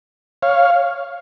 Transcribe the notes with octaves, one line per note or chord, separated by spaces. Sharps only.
C#5 F5